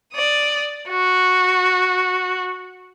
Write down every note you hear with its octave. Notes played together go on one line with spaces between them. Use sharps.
D5 D#6
F#4